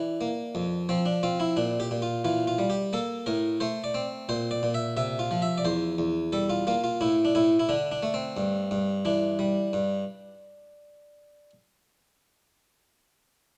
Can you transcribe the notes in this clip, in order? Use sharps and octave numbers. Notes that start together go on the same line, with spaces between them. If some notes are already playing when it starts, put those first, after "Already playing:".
Already playing: E3 D4
A#3
F2
F3 C4
D4
C4 F4
E4
A#2 D4
G4
A#2
F4
E3 F4
F4
G3
G4
A#3 A4
A2 A#4
A3 C5
D5
C4
A#2 C5
D5
A#2
E5
C3 E5
F4
F3
E5
D5
E2 C5
E2
G3 A4
F4
A#3 F4
F4
A2 E4
D4
A2 E4
E4
D3 D4
D4
A3
C4
G2
G2
E3 D4
G3
G2